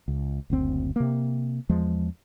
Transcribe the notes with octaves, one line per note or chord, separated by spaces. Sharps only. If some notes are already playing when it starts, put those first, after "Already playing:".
C#2
F#1 D2 C4
C3 A#3
E2 F3 G#3